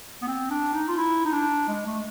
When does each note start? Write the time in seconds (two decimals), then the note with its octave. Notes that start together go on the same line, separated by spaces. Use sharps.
0.22 B3
0.27 C4
0.51 D4
0.74 D#4
0.88 F4
0.97 E4
1.25 D#4
1.33 D4
1.68 G#3
1.86 A3